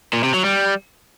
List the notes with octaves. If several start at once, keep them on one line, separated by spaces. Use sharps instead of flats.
A#2
C3
F#3
G3